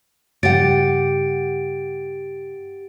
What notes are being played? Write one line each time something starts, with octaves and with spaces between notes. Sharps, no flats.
G2 C#3 G4 F#5 A6 D7